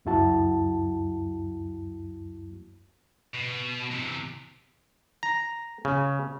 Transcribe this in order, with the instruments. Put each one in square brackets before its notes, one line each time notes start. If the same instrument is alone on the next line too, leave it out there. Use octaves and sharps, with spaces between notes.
[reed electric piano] C#2 F#2 F#3 E4 F#4 A5
[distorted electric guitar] B2
C3 E3
[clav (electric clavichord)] A#5
C#3